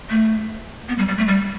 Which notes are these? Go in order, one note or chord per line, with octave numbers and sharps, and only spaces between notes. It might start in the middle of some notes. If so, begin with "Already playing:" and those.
A3
B3
G3
G3
A3
G3